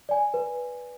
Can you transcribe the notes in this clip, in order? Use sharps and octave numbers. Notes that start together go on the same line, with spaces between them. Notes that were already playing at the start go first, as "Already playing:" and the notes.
D5 G#5
B4